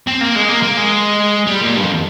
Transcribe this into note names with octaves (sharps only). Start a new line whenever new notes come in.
C4
A#3
G#3
A#3
A#3
G#3
G3
A#2
G2
F2